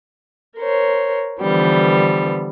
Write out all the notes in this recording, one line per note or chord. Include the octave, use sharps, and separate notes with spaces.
A#4 C5 C#5
D3 E3 F3 G3 B3